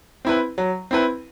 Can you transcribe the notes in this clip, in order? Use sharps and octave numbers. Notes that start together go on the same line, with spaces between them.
C4 E4 B4
F#3
C4 E4 B4